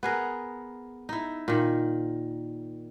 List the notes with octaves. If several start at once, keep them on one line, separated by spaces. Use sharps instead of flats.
B3 G#4 A#4
D#4 E4
A#2 D#3